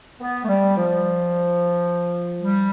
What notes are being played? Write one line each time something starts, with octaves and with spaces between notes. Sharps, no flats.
B3
A3
G3
F3
G3